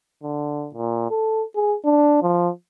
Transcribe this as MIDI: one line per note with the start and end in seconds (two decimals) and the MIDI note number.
0.23 0.69 50
0.74 1.06 46
1.10 1.43 69
1.55 1.76 68
1.85 2.19 62
2.22 2.49 53